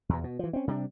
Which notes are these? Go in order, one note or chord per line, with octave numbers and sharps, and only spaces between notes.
E2 B2
B2
E3 F3
C4 C#4
C3 G3 A3 D4